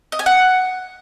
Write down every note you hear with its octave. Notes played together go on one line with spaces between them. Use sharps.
D#5
G#5
F#5